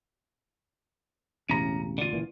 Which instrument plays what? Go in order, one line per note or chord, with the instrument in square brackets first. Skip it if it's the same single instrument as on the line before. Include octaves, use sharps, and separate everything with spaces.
[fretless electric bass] E1 A1 C#3 [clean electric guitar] C#4 A#5
[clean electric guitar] D3 F4
[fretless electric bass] C#2 A#2 E3